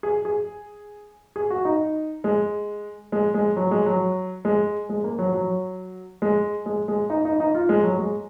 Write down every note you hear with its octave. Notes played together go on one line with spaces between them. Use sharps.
G#4
G#4
G#4
F#4
D#4
G#3
G#3
G#3
F#3
G#3
F#3
G#3
G#3
A#3
F#3
F#3
G#3
G#3
G#3
D#4
D#4
D#4
F4
G#3
F#3
G#3